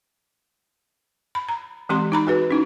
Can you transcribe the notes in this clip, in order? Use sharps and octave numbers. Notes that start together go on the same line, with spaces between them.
B5
A#5
E3 G#3 C4 G4 C6
D#4 A#5 B5
F#4 G#4 B4
C#4 D#4 E4